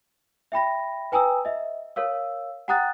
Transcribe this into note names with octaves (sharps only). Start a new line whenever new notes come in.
E5 G5 B5 A#6
B4 G5 G#5 A#5 D#6 E6
D#5 E5
A#4 C#5 F5 E6
F#5 G5 A#5 D#6 F#6 A6